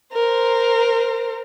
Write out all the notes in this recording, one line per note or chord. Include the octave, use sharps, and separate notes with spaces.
A#4 C5